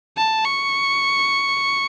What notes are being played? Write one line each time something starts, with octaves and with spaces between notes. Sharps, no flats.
A5
C#6